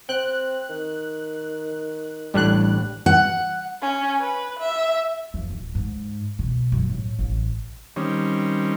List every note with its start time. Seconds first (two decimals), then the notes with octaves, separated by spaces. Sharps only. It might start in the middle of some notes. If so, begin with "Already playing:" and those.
0.09 C4 G5 F#6
0.69 D#3
2.34 A1 A2 G3 D4 F#6
3.06 F#5
3.82 C#4
4.21 B4
4.60 E5
5.34 F2
5.50 D1
5.75 G#2
6.39 B2
6.72 F#2
6.89 A2
7.19 A1
7.96 D#3 G3 C4 C#4